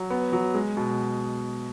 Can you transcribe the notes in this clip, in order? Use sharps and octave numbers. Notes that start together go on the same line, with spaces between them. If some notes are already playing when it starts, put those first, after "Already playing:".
Already playing: F#3
B3
F#3
G#3
B2